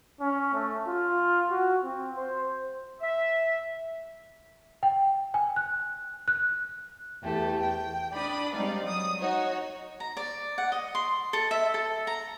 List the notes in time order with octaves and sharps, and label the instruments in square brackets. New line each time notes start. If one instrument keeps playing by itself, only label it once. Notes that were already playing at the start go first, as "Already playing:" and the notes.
[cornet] C#4
A3
F4
F#4
C4
C5
[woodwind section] E5
[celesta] G5
G#5
F#6
F#6
[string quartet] E2 A3 G4
G5
D4 D5 B5 D#6
G3 G#3 C4 D#4 D5 F5
F#3 D#6
D#4 F#4 C#5
[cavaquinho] A#5
D5
F#5
D#5
C6
A4
E5
A4
A#5